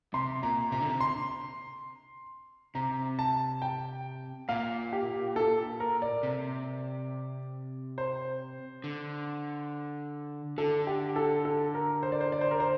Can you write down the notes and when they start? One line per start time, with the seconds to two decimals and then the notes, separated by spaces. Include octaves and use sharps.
0.14 C3 C6
0.43 A#2 A#5
0.72 C3 A#5
0.81 D3
0.90 C3
1.00 C6
2.75 C3 A#5
3.19 A5
3.62 G5
4.49 A#2 F5
4.92 G4
5.36 A4
5.80 A#4
6.02 D5
6.23 C3
7.98 C5
8.84 D3
10.58 D3 A4
10.87 G4
11.16 A4
11.45 A4
11.74 A#4
12.03 C5
12.12 D5
12.21 C5
12.32 D5
12.41 C5
12.51 A#4
12.60 C5